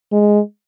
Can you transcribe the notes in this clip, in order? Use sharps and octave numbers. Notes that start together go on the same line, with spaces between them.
G#3